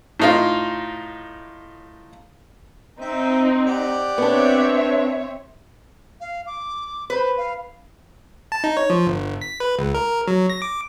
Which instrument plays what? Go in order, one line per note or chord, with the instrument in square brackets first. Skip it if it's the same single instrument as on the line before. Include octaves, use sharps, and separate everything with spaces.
[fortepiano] A2 D#4 F4
[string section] C4 D#4 [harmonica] E5
[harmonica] G4 D5 F#5
[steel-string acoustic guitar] B3 D4 [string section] C4 C#5 E5
[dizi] F5
D6
[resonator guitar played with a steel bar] B4 [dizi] C5
[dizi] F5
[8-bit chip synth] A5
D#4
C#5
F3
G1
B6
B4
C#2
A#4
F#3
A#6
D6